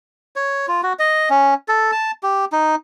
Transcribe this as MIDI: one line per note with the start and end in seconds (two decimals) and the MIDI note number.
0.36 0.66 73
0.68 0.81 65
0.83 0.93 66
0.99 1.29 75
1.30 1.54 61
1.68 1.91 69
1.92 2.11 81
2.23 2.45 67
2.52 2.75 63